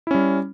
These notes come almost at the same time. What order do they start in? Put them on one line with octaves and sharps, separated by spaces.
E4 C#4 G3